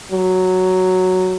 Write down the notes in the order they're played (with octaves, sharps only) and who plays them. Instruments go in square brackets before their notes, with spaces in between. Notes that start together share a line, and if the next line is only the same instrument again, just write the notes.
[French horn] F#3